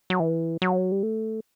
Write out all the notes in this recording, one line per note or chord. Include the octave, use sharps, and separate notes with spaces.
F#3
E3
F#3
G3
A3